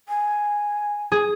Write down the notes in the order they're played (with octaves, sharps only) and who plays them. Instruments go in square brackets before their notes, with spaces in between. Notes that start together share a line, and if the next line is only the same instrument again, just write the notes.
[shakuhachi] G#5
[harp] G#4